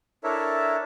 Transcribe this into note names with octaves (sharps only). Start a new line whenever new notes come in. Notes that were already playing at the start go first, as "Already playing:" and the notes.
D4 E4 A4 A#4 C#5 E5